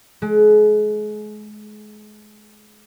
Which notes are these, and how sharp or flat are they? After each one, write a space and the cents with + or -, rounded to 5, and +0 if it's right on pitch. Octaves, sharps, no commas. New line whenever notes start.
G#3 +35